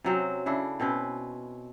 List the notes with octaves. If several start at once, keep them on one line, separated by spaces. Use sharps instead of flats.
C3 F#3 C4 C#4
C#3 D4 E4 A4
B2 C4 C#4 B4